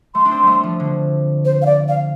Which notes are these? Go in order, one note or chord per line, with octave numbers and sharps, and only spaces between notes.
A3 C6
D4
C4
G3 A3
F3
D3
C5
F5
D5
F5